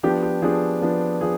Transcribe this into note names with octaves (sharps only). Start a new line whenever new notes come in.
F3 B3 D4 G4
G4
F3 B3 D4 G#4
F3 B3 D4
F3 G#4